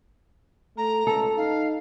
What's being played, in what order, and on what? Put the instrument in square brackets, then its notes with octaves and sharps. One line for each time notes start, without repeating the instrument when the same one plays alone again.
[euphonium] A3 [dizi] A#5
[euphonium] C#2 [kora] A4
[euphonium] D#4 [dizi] F5